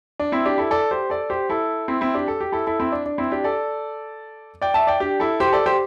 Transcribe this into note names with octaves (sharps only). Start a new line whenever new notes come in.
D4
C4 E4
D4 G4
E4 A4
A4 D5
G4 C5
A4 D5
G4 C5
E4 A4
C4 E4
C4 E4
D4 G4
A4
G4
E4 A4
E4 A4
C4 E4
D4
D4
C4 E4
D4 G4
A4 D5
D5 G5
E5 A5
D5 G5
D4 G4
E4 A4
G4 C5
A4 D5
G4 C5